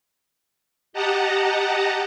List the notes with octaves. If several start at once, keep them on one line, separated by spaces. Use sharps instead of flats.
G4 D#5 F#5 A5 A#5